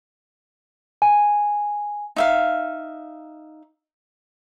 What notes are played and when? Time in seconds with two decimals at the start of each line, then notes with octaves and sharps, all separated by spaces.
1.02 G#5
2.16 D#4 E5 F5